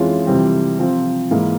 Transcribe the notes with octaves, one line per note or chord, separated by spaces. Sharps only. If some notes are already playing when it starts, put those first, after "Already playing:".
Already playing: F2 E3 G#3 C#4 F4
F2 C3 E3 G3 C4
C3 F3 C4 F4
G#2 E3 A#3 E4